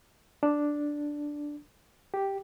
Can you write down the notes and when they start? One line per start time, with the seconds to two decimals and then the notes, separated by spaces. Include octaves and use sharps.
0.43 D4
2.14 G4